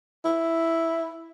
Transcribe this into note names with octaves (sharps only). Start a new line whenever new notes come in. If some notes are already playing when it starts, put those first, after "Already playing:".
E4